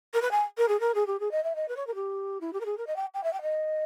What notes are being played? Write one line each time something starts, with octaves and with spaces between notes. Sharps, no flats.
A#4
B4
G#5
A#4
G#4
A#4
G#4
G4
G#4
D#5
E5
D#5
B4
C#5
A#4
G4
E4
G4
A#4
G#4
A#4
D#5
G5
G5
E5
G5
D#5